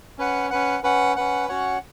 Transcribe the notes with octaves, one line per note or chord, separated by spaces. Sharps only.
C#4 B4 F#5
C#4 B4 F#5
C#4 B4 F#5
C#4 B4 F#5
C#4 F#4 C#5 F#5